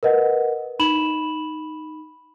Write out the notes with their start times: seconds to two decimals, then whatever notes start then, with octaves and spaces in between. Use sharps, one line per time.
0.03 A#4 B4 D#5 F#5
0.79 D#4 B5 E7 F#7